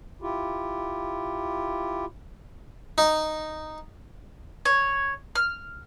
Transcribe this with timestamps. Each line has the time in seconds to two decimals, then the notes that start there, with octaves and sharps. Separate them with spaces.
0.22 E4 F4 G4
2.98 D#4
4.65 C#5
5.35 F6